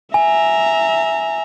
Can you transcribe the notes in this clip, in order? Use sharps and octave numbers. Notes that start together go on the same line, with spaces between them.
E5 G#5 A#5